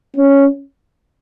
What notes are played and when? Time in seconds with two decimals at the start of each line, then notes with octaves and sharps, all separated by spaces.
0.16 C#4